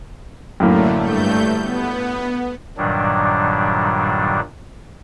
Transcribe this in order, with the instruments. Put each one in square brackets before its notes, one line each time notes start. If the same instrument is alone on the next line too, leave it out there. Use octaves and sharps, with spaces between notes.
[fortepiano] F#2 A2 A#3 [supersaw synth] D3 A3
[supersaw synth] G2 A3 G6
B3
[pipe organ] G2 A#2 D#3 F#3 G3 D4